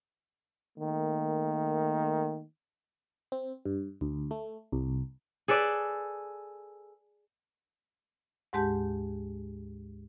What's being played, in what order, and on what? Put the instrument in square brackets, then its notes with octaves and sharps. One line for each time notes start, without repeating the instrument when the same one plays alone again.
[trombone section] D#3 A3 A#3
[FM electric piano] C4
G2
D2
A3
C2
[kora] G#4 A4 B4 D5
[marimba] D2 G#2 G#3 G4 A5 G6